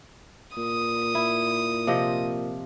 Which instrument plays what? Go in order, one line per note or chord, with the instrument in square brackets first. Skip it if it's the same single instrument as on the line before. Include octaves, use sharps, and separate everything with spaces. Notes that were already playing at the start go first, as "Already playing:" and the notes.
[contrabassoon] A#2 [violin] D#6
[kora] E4
C3 F3 D#5